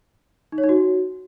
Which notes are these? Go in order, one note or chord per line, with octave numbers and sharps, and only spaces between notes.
D#4
C#5
D#4
F#4